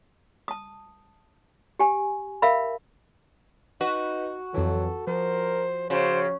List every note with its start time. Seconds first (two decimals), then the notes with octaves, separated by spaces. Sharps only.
0.48 A5 D#6
1.79 G4 G#5
2.42 A#4 E5 F5 B5
3.81 D#4 F#4 B4
4.54 F2 E3 F#3 A4
5.07 F3 A#4 C5
5.90 C#3 F#4 C5